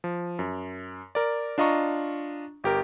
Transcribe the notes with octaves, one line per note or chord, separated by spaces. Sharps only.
F3
F#2
A#4 D5
D4 F4 D#5 A#5 C#6
G1 G4 A#4